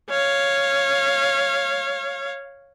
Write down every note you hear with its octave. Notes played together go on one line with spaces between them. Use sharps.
C#5 F5